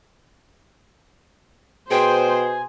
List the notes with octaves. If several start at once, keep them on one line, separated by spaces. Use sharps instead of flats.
B2 G#4 C5 G5